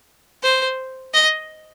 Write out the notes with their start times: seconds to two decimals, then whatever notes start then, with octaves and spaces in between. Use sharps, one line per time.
0.43 C5
1.14 D#5